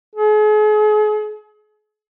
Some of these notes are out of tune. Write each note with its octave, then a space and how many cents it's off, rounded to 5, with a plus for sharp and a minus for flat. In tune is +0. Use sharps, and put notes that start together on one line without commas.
G#4 +40